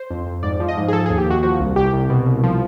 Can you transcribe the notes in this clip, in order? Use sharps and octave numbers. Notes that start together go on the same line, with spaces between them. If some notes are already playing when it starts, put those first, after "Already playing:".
Already playing: C5
F2
F2
G#2 D5
F3
D#5
G#2
G#4
F3 A4
D#2 G#4
G4
D#2 F#4
F3 F#4
C2
C2 G4
C2
B2
C2
F3